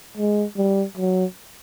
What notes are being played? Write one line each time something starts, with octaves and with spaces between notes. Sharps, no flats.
G#3
G3
F#3